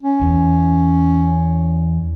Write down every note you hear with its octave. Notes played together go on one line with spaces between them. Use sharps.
C#4
E2